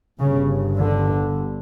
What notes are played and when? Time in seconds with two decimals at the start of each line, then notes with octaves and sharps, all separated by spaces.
0.19 G1 G2 C#3
0.78 D3